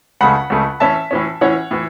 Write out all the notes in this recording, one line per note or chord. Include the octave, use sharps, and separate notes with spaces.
C#2 C#3 A3 F#5 B5
C#2 C#3 A3
A2 E3 C#4 E5 A5
A2 E3 C#4
A2 E3 C#4 C#5 F#5
A2 E3